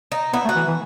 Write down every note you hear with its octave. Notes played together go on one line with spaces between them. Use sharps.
D#4
B3 E4
A3
F#4
E3
E3